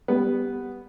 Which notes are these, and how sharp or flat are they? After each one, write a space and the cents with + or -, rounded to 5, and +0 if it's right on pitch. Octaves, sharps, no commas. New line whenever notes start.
G3 +10 B3 +0